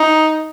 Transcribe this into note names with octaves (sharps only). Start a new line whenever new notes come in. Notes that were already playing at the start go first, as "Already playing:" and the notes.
Already playing: D#4